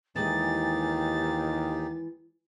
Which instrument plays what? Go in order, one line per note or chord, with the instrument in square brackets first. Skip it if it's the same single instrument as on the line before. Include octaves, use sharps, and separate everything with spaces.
[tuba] D#2 [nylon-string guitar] E3 G#3 [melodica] D#4 G4 G#4 [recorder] A6